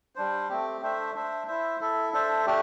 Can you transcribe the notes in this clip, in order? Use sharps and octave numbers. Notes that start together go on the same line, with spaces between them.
G3 D4 C5
A3 C4 G4
A3 D4 C5 E5
D4 C5 E5
E4 C5 E5
E4 A4 E5
D4 A4 C5 E5
A3 D4 G4